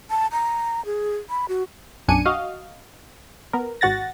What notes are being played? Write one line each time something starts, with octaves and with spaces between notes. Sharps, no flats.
A5
A#5
G#4
B5
F#4
B1 F#2 D4 G#5 C#7 D#7
F#4 D#5 F5
B3 A#4
G#1 F#4 F#5 A6 A#6